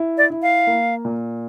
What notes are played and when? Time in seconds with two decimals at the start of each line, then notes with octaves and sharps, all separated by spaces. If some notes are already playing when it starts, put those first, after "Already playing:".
Already playing: E4
0.18 D5
0.30 E4
0.42 F5
0.67 A#3
1.05 A#2